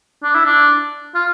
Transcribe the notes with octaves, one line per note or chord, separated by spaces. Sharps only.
D4
E4
D4
F4